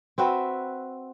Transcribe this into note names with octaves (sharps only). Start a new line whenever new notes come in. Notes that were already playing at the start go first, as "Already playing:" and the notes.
C4 F#4 B4 E5